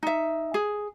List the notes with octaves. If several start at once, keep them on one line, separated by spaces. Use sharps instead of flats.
D#4 E5
G#4